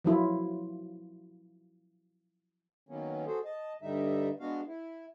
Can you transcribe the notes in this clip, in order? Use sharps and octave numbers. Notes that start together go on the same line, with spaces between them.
F3 F#3 E4 F4
D#3 F#3 A#3 B3 C#4
F#4 G#4 A4 C5
D#5 A5
G2 D3 G3 D#4 E5
G#3 B3 D4 F#4 F5
E4